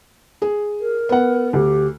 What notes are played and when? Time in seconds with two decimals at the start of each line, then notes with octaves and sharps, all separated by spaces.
0.42 G#4
0.80 A#4
1.09 B3 F#5
1.53 D2 G4